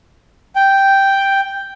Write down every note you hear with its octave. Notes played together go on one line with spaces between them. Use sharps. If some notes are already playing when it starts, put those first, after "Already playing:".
G5